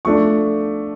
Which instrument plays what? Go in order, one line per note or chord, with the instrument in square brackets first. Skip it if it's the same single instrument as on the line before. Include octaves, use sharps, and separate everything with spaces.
[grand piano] F3 A3 D4 C#6